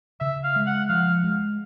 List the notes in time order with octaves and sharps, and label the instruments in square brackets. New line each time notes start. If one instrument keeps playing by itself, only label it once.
[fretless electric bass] C#3 [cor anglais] E5
[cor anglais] F5
[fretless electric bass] G#3
[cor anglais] F#5
[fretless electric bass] F3 [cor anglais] F5
[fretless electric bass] G#3